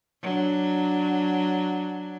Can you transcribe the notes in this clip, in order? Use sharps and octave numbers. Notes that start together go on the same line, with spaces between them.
F#3 D4